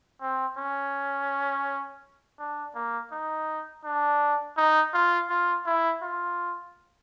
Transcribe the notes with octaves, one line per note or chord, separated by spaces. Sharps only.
C4
C#4
D4
A#3
D#4
D4
D#4
F4
F4
E4
F4